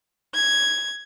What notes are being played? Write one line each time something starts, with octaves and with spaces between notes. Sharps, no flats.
G#6